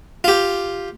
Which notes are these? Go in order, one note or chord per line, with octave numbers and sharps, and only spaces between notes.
F4 G4